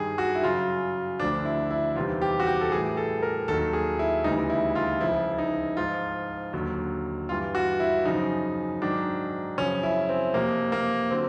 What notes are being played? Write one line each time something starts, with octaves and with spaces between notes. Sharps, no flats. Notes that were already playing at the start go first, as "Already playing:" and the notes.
Already playing: G2 D#3 G3 G#4
F#4
E4
F#2 C#3 F#3 F4
D2 D3 F3 D4
E4
E4
E2 C3 D#3 G3 F4
G4
F#4
G4
A4
A2 E3 G3 G#4
A4
A#4
D#2 D#3 F#3 A4
G#4
E4
D2 C#3 E3 G3 D#4
E4
F4
C#2 C#3 F3 E4
D#4
G#2 F3 F4
D#2 D3 F#3
G2 E3 G3 F4
F#4
E4
F#2 C#3 F3 D#4
G#2 D#3 F#3 D4
F#2 C#3 F3 C#4
E4
C4
F2 C3 F3 A#3
A#3
D3 F#3 C4